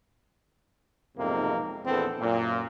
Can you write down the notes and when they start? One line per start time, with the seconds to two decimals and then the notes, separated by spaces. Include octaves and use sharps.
1.17 B1 F2 G#2 C3 A#3
1.85 A#1 E2 B3 C4 A4
2.20 F#2 A#2